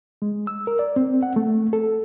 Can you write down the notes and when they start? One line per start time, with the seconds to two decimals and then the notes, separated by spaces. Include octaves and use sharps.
0.22 G#3
0.47 E6
0.67 A#4
0.79 D5
0.96 C4
1.23 F#5
1.36 A3
1.73 A4